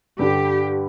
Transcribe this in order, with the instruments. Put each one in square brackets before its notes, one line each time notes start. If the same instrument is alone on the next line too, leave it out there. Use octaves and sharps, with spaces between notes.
[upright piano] G2 D3 G3 [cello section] G4